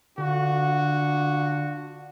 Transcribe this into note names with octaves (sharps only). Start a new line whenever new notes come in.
D3 D4 F4 F#4